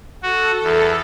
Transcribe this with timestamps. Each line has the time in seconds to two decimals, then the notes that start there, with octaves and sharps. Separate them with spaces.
0.23 F#4 A4
0.63 E2